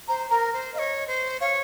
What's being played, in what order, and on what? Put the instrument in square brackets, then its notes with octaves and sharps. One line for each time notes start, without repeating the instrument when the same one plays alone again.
[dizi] C5 [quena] A#5
[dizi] A#4 [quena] A#5
[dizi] C5
[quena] D#5 [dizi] F5
[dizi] C#5
C5
[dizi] C#5 [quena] F5